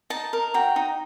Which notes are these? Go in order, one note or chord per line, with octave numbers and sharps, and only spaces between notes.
D#4 A5
A#4
F#4 G5
D#4